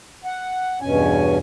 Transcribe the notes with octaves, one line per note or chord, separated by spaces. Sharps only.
F#5
E2 G2 B2 C#4 G#5